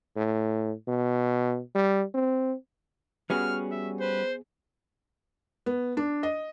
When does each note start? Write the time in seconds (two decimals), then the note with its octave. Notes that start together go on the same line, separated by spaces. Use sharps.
0.17 A2
0.88 B2
1.75 G3
2.15 C4
3.30 G3 B3 C#4 F#4 G#4 F6
3.71 E5
4.01 B4 C5
5.66 B3
5.97 D4
6.23 D#5